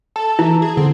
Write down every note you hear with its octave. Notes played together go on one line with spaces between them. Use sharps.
A4 A5
E3 E4
G#4
D3 C4